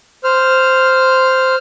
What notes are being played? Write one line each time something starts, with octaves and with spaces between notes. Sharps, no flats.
C5 F6